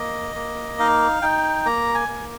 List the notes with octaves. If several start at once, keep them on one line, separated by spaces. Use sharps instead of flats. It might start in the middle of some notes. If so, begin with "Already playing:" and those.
Already playing: A#3 D#5
A#3
D#4 F5
D#4 G5
A#3 A#5
G#5
A#3